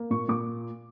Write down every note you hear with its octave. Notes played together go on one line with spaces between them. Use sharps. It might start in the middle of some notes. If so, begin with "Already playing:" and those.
Already playing: A#3
A#2 C#6
A#2 D6